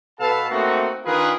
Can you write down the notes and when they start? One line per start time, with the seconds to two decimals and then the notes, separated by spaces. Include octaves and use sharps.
0.20 B2 A4 B4 F5 A5
0.51 A3 A#3 C4 D#4 F#4
1.05 D#3 D4 F4 G#4 A#4 B4